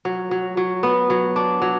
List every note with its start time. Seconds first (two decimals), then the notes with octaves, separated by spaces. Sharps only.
0.05 F#3
0.31 F#3
0.57 F#3
0.83 B3
1.10 F#3
1.36 D4
1.62 F#3